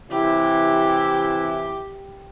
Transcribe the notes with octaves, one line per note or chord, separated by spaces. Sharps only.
C3 E3 E4 G4